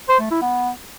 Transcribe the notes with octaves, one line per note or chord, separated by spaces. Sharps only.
C5
A3
E4
B3